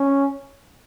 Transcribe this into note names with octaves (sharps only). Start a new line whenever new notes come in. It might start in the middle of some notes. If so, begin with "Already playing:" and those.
Already playing: C#4